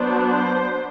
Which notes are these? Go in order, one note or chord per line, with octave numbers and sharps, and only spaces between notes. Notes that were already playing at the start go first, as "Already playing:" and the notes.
Already playing: F#3 B3 D4 C5
C5